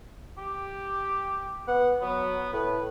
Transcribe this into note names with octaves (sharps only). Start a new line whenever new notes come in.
G4
B3 F#5
F#3 B3
A2 B4